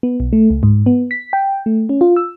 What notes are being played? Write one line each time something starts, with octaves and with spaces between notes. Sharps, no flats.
B3
B1
A3
C#2
G#2
B3
B6
G5
A3
C#4
F4
E6